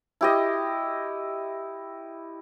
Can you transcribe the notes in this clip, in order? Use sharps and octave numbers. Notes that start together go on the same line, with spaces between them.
E4 G4 D#5